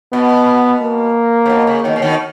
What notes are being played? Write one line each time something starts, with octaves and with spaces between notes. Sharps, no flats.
B2 B3
A#3
C#3
B2
C#3
B2 D#3
C#3
B2 D#3